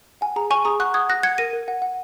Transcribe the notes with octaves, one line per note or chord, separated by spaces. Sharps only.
F#5 G#5
G#4 A#5
G#4 G#5 C#6
G#4 A#5 D#6
F#5 C#6 F#6
F#5 D#6 G#6
F#5 F#6 A#6
F#5 G#6 C#7
A#4 A#6 D#7
A#4
F#5
F#5